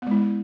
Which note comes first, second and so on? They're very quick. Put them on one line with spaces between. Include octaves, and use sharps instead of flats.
B3 G#3 E4